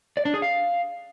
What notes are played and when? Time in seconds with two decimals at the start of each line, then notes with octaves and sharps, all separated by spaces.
0.17 D5
0.25 D4
0.34 G#4
0.42 F5